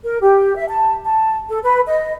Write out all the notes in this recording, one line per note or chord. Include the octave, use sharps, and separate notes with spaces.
A#4
G4
E5
A5
A5
A4
B4
D#5